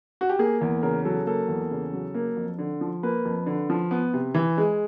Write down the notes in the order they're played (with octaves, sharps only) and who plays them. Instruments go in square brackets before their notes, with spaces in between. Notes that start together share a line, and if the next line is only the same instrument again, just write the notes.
[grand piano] F#4
G4
A#3 G#4
E2
C#3 A#4
F#3 A4
A#3 A4
E2
C#3
F#3
A#3
F2
D3
F3
A#3 B4
F2
D3
F3
B3
C3
E3
G#3